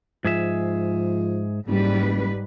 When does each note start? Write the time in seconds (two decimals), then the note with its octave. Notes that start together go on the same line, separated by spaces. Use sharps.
0.25 G#2 F3 G#4 E5
1.67 F#1 G#2 G3 B4